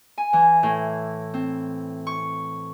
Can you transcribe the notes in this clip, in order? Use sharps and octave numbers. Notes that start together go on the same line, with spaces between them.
G#5
E3
A2
C4
C#6